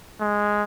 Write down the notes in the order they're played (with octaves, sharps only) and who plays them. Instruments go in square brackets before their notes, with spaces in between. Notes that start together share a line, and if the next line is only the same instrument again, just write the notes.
[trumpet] G#3